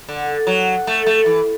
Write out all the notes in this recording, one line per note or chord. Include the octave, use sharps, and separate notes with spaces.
D3
F#3
A3
A3
E3